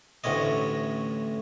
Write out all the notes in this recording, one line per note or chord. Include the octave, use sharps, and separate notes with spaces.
A1 D2 A2 C#4 D#5